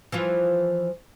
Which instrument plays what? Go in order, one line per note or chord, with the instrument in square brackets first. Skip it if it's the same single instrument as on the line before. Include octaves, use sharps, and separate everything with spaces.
[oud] E3 F3 F4